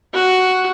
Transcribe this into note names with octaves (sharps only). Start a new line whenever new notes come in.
F#4